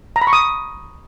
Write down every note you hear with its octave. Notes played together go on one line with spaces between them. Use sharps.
A#5
B5
C#6
D#6